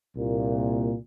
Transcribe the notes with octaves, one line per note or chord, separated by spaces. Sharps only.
C2 A#2